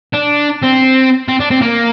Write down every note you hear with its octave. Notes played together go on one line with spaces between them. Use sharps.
D4
C4
C4
D4
C4
A#3